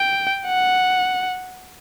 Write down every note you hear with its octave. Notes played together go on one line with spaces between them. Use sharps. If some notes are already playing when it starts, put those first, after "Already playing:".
Already playing: G5
F#5